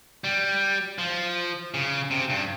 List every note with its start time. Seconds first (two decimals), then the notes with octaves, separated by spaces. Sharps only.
0.24 G3
0.99 F3
1.74 C#3
2.11 C3
2.30 G2